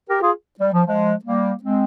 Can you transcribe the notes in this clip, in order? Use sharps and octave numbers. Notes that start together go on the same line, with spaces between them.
G4 A#4
F4 G#4
G3
F3
F3 G#3
G3 A#3
G#3 C4